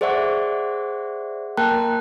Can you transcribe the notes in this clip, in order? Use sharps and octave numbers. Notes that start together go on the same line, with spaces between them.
G#4 C5 D5 E5 F#5 C#6
A#3 A#4 G5 A5 A#5 F#6